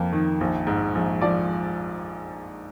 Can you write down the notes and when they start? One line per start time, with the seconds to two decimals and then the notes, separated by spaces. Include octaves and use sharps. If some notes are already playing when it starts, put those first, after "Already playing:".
Already playing: F2 A#3
0.12 D#3
0.41 A#1
0.67 G#2
0.95 A#1
1.21 F3 D5